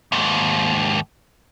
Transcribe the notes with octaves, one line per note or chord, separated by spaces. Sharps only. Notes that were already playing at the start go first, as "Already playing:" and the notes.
D#2 G#2